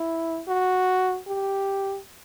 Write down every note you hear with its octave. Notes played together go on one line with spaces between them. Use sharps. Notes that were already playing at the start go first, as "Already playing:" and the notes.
Already playing: E4
F#4
G4